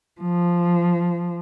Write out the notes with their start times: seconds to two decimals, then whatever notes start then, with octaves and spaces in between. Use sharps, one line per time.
0.21 F3